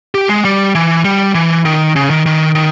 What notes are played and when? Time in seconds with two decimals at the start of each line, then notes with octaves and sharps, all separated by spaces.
0.15 G4
0.29 G#3
0.45 G3
0.75 E3
1.05 G3
1.35 E3
1.65 D#3
1.96 C#3
2.10 D#3
2.26 D#3
2.55 D#3